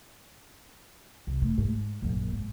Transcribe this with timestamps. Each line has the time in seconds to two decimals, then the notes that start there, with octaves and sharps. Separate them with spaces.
1.27 C2
1.42 A3
1.58 G#2
2.02 A#1 F#2
2.32 G#2